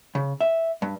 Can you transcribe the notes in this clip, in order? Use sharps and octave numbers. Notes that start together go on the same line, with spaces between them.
C#3
E5
G2